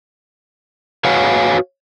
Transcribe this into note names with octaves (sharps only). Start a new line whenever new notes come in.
F#4 B4 C#5 F5 F#5 G#5